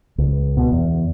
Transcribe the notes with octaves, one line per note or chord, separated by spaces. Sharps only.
C#2
B2
E2